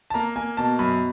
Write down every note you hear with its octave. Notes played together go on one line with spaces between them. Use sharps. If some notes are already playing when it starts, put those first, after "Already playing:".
A5
A#3 A#5
A#3 G#5
B2 A5
F#2 B5